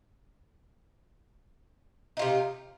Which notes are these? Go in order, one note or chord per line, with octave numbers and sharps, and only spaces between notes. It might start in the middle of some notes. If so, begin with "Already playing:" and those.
C3 D#4 F4